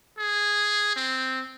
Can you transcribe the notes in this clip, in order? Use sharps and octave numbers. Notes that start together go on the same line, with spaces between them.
G#4
C4